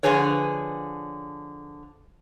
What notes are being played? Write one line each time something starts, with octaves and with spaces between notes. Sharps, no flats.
D3 F3 G#4 B4 C#5